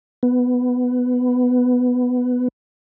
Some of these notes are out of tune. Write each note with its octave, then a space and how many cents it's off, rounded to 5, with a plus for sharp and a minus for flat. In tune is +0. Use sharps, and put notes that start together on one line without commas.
B3 +10